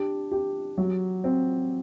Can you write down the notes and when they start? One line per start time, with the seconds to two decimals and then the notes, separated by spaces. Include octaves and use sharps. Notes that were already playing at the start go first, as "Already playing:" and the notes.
Already playing: D4 G4
0.31 G4
0.78 F#3
1.24 C4